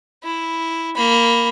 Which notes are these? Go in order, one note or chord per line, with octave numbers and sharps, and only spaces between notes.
E4
A#3 B5